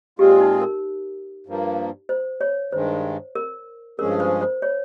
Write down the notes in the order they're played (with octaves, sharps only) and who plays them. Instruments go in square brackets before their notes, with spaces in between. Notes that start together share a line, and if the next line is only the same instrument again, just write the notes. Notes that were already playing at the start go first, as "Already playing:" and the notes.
[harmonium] A#2 G#3 C4 F4 G#4 [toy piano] G4
[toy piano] D#4
A#4
[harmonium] G2 F3 A#3
[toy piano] C5
C#5
[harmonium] G2 D#3 G#3 [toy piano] C5
[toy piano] A#4
[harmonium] G2 F3 G#3 C#4 G#4 [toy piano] A#4
[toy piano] C5
C5
C#5